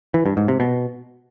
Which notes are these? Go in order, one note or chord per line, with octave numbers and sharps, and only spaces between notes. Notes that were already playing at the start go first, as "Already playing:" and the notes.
E3
G2
G#2
C3
B2